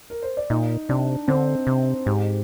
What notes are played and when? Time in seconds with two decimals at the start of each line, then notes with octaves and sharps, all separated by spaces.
0.10 A#4
0.22 C5
0.37 D5
0.50 A#2 D#4 D#5
0.89 C3 D4 D5
1.28 D3 C4 C5
1.67 C3
2.06 G#2 G4